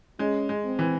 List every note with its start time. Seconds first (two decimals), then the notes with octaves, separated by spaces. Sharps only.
0.19 G#3 C#4
0.49 G#3
0.64 C4
0.79 E3